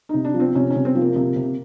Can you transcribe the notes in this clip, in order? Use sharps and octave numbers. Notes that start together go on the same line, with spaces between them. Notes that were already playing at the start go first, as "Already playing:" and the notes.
C3 D#4
D4
F3
C4
C3 C#4
C#4
C3
C4
F3
A#3
C3
C3